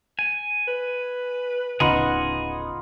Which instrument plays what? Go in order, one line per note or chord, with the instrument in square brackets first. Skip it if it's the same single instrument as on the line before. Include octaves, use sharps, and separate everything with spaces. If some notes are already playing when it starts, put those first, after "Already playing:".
[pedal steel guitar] G#5
[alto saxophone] B4
[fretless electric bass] D1 C#3 [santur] B3 D#4 F4 [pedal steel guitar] G#4 D#5 F#5